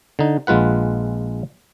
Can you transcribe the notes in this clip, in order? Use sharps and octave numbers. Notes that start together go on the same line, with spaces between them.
D3 D#4
A#1 G#3 F4 B4 F#5